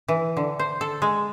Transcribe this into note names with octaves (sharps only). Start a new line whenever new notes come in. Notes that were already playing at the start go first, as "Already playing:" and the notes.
E3
D3
C5
A4
G#3